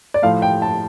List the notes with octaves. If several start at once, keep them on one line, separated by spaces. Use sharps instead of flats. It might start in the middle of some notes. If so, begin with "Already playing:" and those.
D5
A2 F3 A3 F5
G5
A5